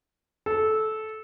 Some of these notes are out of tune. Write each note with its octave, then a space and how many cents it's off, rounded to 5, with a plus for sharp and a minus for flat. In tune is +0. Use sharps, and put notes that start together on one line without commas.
A4 -15